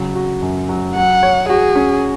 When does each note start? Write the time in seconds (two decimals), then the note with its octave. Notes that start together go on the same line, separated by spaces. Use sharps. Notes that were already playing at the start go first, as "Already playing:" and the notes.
Already playing: C#3 F#3
0.15 F#4
0.42 F#2
0.69 F#3
0.95 F#3 F#5
1.23 C#5
1.49 F#4 G#4
1.75 C#4